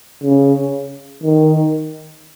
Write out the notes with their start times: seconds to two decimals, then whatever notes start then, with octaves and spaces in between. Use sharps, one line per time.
0.23 C#3
1.23 D#3